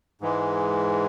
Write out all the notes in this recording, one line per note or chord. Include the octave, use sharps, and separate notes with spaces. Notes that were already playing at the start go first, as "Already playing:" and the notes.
G#2 E3 G#3